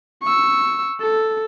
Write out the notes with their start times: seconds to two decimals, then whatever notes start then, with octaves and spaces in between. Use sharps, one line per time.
0.23 C#6 E6
1.01 A4